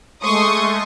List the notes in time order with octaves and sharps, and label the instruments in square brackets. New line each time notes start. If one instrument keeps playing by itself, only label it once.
[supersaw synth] G#3 A3 [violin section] C6 C#6 D#6